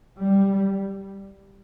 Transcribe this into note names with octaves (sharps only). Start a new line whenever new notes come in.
G3